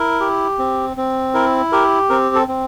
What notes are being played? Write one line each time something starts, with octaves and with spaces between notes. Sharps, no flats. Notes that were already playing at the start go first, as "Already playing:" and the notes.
Already playing: E4 A#4
G4
C4
C4
E4 A#4
G4 A#4
C4 A#4
A4
C4